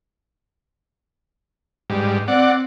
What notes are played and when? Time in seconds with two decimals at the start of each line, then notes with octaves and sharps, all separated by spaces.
1.90 G#2 G3
2.28 C4 D5 F#5